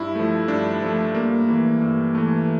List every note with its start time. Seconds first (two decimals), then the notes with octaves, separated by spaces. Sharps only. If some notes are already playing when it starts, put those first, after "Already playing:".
Already playing: G2 E4
0.15 F3 A3
0.48 G2 D4
0.82 F3 A3
1.15 G2 A#3
1.48 E3 A3
1.82 G2
2.15 E3 A3